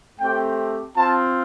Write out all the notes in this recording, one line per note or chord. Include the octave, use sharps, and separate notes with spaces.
A3 C4 G4 G5
C4 F4 A5